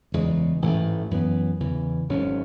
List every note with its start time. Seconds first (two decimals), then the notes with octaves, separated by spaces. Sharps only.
0.12 F#1 E2 C#3 G#3
0.62 A1 G#2 E3 A3
1.11 F#2 E3 B3
1.60 E2 C#3 E3
2.09 G#1 G#2 F#3 C#4